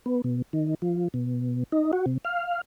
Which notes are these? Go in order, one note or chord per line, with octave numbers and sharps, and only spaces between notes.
B3
B2
D#3
F3
B2
D#4
F#4
C3
F5